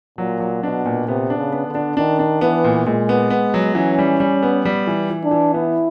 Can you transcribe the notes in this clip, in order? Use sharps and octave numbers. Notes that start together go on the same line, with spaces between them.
A#2 F#3
F#3
B2 D4
A#2
C3 B3
D4
C#3
B3
D3
D4
D#3 D4
D4
E3 B3
A#2
A#2 G#3
B3
B3
F#3
E3 C#4
G3
G3
B3
G3
E3
E3
D4
E3
B3 E4